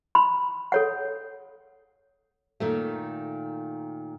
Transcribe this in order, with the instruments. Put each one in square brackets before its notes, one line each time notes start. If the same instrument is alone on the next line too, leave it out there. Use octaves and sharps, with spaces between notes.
[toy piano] B5 C6
A4 C#5 F#5
[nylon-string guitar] A#2 D#3 A3